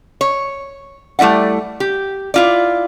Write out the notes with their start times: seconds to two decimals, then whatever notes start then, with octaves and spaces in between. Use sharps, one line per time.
0.21 C#5
1.19 G3 A3 E4 D5 F#5
1.80 G4
2.34 E4 F4 D5